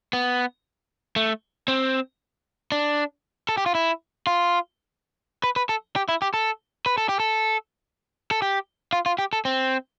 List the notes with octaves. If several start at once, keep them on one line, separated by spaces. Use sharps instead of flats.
B3
A3
C4
D4
A4
G4
F4
E4
F4
B4
B4
A4
G4
E4
G4
A4
B4
A4
G4
A4
A4
G4
F4
F4
G4
A4
C4